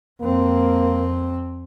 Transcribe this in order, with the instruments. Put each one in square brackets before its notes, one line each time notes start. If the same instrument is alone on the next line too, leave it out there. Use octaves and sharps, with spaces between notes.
[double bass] F2 C4 [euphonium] A#3